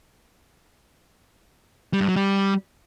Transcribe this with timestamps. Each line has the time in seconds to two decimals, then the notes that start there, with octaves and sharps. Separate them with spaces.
1.93 G3
2.01 G2
2.08 F#3
2.16 G3